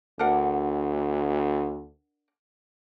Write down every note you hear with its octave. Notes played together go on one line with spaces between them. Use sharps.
D2 D4 A#4 F#5